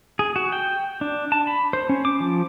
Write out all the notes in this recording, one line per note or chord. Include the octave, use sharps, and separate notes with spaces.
G#4
F#4
G5
D4
A5
B5
C5
C#4
D6
F3